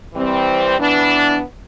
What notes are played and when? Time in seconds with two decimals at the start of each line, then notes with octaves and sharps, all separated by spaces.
0.13 E3 G3 C4
0.77 E3 B3 D4